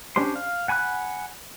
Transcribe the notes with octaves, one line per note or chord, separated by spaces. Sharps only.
C#4 D4 G4 C5 C6
F5
F#5 G#5 B5 C#6 F#6